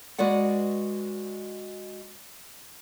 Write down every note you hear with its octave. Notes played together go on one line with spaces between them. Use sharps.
G#3 F#4 B4 D5 F#5